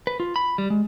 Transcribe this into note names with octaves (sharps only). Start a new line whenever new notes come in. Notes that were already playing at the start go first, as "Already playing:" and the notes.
B4
F4
B5
G3
G#3